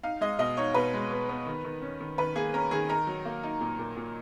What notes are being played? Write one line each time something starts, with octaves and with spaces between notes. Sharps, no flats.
D#4 F5
G#3 D#5
B2 D#5
D#4 C#5
B2 B4
G#3
B3
B3
D#3
D#3
C#4
D#3
D#3 B4
A#3 G#4
C#4 A#4
D#3 G#4
D#4 A#4
F#3
A#3
D#4
A#2
A#2
A#2